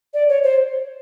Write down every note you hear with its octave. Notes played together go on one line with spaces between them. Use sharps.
D5
C#5
C5